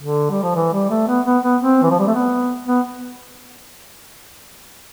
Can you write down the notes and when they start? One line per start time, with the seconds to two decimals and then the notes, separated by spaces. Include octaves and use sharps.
0.02 D3
0.30 G3
0.42 F3
0.56 E3
0.73 G3
0.90 A3
1.08 B3
1.26 B3
1.44 B3
1.62 C4
1.83 E3
1.91 F3
1.99 G3
2.07 A3
2.15 B3
2.68 B3